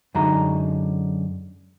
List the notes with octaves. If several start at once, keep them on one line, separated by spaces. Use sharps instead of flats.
F#2 D3 G#3 D#4 A#5